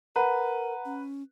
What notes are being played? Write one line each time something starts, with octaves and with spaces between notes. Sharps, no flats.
A#4 B4 F#5 A#5
C#4